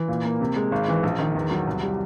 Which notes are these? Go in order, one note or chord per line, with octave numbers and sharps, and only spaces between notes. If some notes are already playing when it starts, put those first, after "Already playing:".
Already playing: E3
A#2
A#3
C3
G#3
G#1
E3
A#1
D#3
E2
F#3
C2
G3